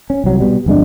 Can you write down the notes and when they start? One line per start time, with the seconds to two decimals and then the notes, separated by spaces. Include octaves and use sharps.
0.10 C#4
0.24 C2 F#3
0.40 B2 G3
0.66 G1 F2 G#3 D4